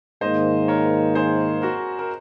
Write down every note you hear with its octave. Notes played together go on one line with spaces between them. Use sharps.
G#2 D#3 A#3 C5 D#5
A#4 C#5
G#4 C5
F#4 A#4
A#4